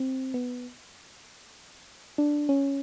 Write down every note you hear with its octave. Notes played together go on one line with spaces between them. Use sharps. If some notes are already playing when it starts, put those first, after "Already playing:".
Already playing: C4
B3
D4
C#4